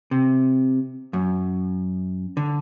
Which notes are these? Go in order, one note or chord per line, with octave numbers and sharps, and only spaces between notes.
C3
F#2
D3